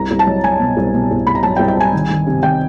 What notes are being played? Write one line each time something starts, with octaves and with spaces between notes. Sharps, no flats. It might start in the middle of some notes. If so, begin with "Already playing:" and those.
Already playing: C2 A#5
C2
A5
F#3
F#3 G#5
B2
C2
B2
C2
B2 B5
A#5
F#3 A5
G5
C2
G5
C2 G#5
D#3
D#3
C3
D#3 G5